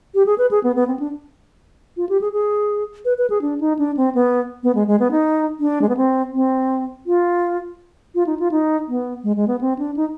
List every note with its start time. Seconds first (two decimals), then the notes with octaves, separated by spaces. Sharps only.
0.15 G4
0.26 G#4
0.38 B4
0.51 G#4
0.64 B3
0.76 B3
0.88 C4
0.99 D4
1.97 F4
2.09 G4
2.21 G#4
2.33 G#4
3.05 B4
3.18 B4
3.30 G#4
3.42 D4
3.61 D#4
3.79 D4
3.97 C4
4.15 B3
4.63 B3
4.75 G#3
4.87 G#3
5.00 B3
5.11 D#4
5.60 D4
5.82 G#3
5.89 B3
5.97 C4
6.33 C4
7.06 F4
8.15 F4
8.27 D#4
8.40 F4
8.51 D#4
8.88 B3
9.24 G#3
9.37 G#3
9.48 B3
9.61 C4
9.79 D4
9.97 D#4